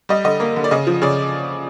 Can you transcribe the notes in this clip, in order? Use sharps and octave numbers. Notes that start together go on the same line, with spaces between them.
G3 D#5
D3 D#5
A#3
D3
D5
C#3 D#5
F3
C#3 D5